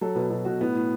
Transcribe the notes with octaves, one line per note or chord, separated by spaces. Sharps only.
F#3 A4
B2 B4
B2 A4
B2 F#4
A2 B3
A2